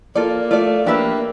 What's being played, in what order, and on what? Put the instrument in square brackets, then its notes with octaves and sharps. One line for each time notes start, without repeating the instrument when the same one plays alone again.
[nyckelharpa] A#3 [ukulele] F4 A4 D5
[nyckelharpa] A3 [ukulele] F4 A4 D5
[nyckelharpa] A#3 [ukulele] D4 G4 B4 E5